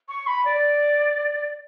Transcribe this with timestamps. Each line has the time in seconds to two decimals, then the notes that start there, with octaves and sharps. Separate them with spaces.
0.09 C#6
0.27 B5
0.45 D5